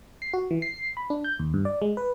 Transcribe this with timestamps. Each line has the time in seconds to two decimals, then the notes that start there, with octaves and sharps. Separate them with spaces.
0.22 C7
0.33 F#4
0.51 E3
0.62 C7
0.97 B5
1.10 D4
1.24 G6
1.39 D#2
1.54 G2
1.65 D5
1.82 G#3
1.97 B4